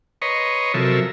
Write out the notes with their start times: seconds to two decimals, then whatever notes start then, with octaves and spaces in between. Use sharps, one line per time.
0.22 B4 C#5 D#5 A#5 C6 C#6
0.74 C3 F3 F#3 A4 A#4 E5